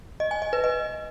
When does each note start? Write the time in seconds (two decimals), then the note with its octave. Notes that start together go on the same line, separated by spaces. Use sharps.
0.20 D#5
0.31 G#5
0.42 D#5
0.53 B4
0.64 D#5